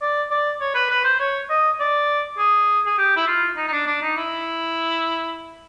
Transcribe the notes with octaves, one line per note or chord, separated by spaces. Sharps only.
D5
D5
C#5
B4
B4
C5
C#5
D#5
D5
G#4
G#4
G4
E4
F4
D#4
D#4
D4
D4
D#4
E4